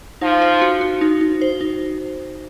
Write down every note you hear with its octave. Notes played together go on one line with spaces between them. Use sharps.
F3 D#4
C5
F#4
F#4
D#4
D#4
C5
D#4